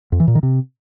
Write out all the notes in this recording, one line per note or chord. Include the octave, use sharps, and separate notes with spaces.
F2
E3
A#2
D#3
C3